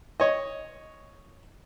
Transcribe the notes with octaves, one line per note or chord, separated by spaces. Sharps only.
C#5 D#5